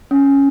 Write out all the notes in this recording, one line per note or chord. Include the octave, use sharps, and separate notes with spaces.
C#4